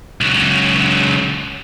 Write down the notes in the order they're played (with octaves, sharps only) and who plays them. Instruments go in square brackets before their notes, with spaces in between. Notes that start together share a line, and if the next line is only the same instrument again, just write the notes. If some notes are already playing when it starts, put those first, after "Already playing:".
[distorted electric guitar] C#2 F#3